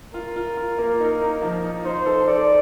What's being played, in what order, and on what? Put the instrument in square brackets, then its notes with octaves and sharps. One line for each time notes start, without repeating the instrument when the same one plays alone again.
[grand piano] F4 [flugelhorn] A#4
[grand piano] F4
F4
A#3
D#4
D#4
F3
D#4
[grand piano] D#4 [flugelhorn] C5
[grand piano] A4
[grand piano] A4 [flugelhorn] D5